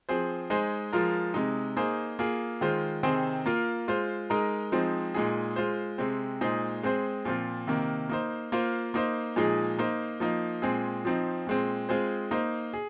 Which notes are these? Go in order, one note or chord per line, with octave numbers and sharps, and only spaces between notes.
F3 C4 G#4 C5
G#3 D#4 G#4 C5
F3 G#3 F4 A#4
C3 G#3 D#4
A#3 D#4 G#4 C5
A#3 F4 G#4
D#3 G#3 F4 C5
C3 D#3 C4 G#4 C5
A#3 F4 A#4
G#3 F4 C5
G#3 D#4 A#4
F3 G#3 C4 D#4
A#2 G#3 D#4 G#4
G#3 F4 C5
C3 G#3 C4
A#2 G#3 D#4 G#4 C5
G#3 C4 G#4 C5
A#2 F3 C4 F4
C3 D#3 A#3
A#3 D#4 C5
A#3 F4 C5
A#3 D#4 C5
A#2 F3 G#3 D#4 G#4
A#3 D#4 C5
F3 A#3 D#4
A#2 G#3 C4 G#4
F3 C4 D#4
A#2 G#3 C4
G#3 C4 F4 G#4 C5
A#3 D#4 C5
G#4